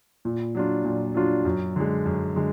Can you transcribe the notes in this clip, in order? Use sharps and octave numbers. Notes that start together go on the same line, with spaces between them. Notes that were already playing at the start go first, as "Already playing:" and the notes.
A#2
F#3 D4 F4
A#2
F#3 D4 F4
F#2
D3 G#3
F#2
D3 G#3